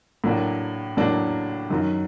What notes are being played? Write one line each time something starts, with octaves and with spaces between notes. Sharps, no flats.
A2 F#3 A#3 D4
A2 F#3 A#3 D4
F#2 D#3 F#3